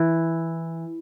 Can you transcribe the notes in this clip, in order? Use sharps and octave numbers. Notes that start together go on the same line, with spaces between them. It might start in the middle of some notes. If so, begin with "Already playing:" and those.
Already playing: E3